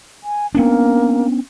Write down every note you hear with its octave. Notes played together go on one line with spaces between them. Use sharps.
G#5
A#3 B3 C#4 D4